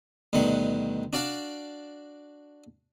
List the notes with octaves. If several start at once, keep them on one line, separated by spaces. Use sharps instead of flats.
D2 G2 B2 D#3 F#5
D4 F#4 D5 F5 A5